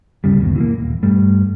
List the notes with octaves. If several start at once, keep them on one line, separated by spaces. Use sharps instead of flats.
D2 G2 C#3 G3
G1 D#2 B2
E3 F#3 A#3
D#1
G2 G3 A3